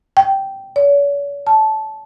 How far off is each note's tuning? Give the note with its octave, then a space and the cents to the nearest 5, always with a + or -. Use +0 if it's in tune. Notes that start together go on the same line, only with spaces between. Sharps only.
G5 -10
C#5 +45
A5 -15